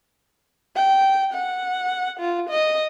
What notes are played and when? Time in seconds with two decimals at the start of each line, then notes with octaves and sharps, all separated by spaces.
0.76 G5
1.33 F#5
2.20 F4
2.50 D#5